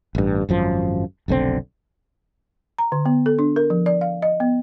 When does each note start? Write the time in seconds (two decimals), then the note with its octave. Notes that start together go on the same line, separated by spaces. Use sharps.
0.15 A1 G2
0.49 G#1 F#2 F3
1.28 F1 B1 D3 C4
2.78 A#5
2.92 D3
3.06 B3
3.26 A4
3.39 D4
3.56 A#4
3.70 F3
3.86 D5
4.01 F5
4.22 D#5
4.40 B3